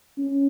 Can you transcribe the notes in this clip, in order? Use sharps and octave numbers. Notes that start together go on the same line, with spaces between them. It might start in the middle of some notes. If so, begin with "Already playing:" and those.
C#4